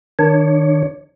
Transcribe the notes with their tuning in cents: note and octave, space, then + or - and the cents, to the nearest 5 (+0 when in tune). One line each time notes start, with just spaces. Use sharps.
D#3 +0 D4 +20 C#5 +10